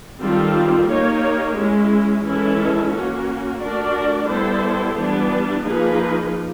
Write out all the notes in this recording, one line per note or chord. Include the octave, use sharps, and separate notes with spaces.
D#3 G3 C4 F4 A4
A#3 D#4 G4 A#4 C#5
G#3 C#4 E4
E3 G#3 C#4 E4 A4
A#3 C#4 F#4
A3 D4 F#4 A#4 D5
G3 B3 E4 A4 C5
E3 G3 B3 D4
F3 A#3 D#4 G#4 B4